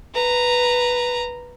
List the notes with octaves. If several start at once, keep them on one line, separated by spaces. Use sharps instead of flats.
B4 A#5